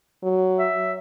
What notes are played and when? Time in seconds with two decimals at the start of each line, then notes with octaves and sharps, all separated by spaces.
0.23 F#3
0.59 E5